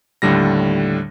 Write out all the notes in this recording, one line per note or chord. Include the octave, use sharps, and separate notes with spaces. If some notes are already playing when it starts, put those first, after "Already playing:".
D#2 A2 D3 G3 A#6